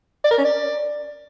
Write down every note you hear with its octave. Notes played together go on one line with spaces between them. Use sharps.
D5
A#4
C#4
D5